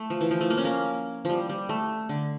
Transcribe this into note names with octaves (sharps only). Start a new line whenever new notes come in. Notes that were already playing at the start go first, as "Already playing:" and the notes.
Already playing: A3
F3
E3
F3
A3
A#3
C#4
A#3
F3 G3
G3
A3
D3